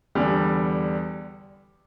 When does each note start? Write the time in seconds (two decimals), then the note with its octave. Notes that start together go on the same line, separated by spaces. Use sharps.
0.15 E2 D3 G3